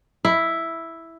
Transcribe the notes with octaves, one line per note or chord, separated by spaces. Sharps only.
E4